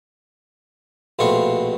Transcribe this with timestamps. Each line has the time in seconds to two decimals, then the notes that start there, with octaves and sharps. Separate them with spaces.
1.19 A#1 B2 A3 C4 F4 C#6